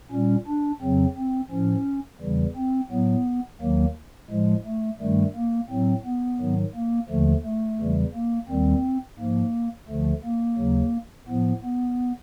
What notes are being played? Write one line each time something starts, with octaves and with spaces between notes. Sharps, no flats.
A#2 G3 C#4
D4
F2 C#3 F#3 C4
C4
A2 F3 C#4
E2 C#3 E3 G3
C4
A2 F#3 B3
D#2 D#3 F#3 A#3
A2 F3 G#3
A3
G2 D#3 G3 A3
A#3
A2 F#3 C4
B3
G#2 D#3 F#3
A#3
D#2 D3 F3 A3
A3
E2 C#3 E3 G3
A#3
D#2 D#3 G3 C4
G#2 F3 A#3
D2 D3 F3 A3
A#3
D#2 C#3 F#3
A2 F3 B3
B3